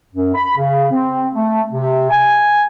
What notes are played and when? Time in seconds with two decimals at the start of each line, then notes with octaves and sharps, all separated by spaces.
0.12 F#2
0.35 B5
0.56 C#3
0.91 C4
1.32 A3
1.72 C3
2.09 G#5